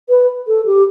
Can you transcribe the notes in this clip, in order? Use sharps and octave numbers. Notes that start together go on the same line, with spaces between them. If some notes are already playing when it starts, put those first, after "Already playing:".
B4
A4
G4